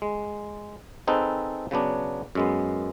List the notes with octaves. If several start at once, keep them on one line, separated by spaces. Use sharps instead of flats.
G#3
C4 D#4 G#4 A4 B4
C#3 F#3 B3 D4
F#2 G#3 B3